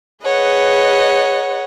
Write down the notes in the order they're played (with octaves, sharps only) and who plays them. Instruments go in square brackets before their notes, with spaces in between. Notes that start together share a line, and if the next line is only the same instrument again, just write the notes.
[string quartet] G#4 B4 D#5 [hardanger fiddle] C#5 F#5